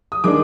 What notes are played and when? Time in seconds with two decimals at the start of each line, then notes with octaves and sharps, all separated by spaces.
0.12 D#6
0.24 D#3 G#3 D4 D6